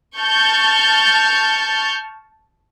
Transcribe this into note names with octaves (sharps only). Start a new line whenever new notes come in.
A5 C#6 F6 G6 A6